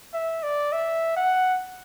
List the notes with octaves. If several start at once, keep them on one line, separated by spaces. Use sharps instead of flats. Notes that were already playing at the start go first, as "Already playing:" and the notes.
E5
D5
E5
F#5